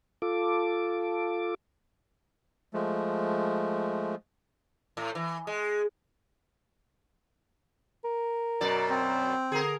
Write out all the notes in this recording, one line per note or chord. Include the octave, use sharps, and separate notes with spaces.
F4 A4 D6
F3 G#3 A3
A2
E3
G#3
A#4
F#2 B2 D5
C4
D3 G#4 A#4